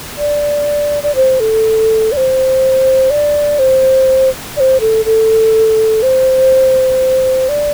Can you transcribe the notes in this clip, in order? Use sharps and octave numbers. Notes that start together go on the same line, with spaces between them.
D5
D5
C5
A4
D5
C5
D5
C5
D5
C5
A4
A4
C5
D5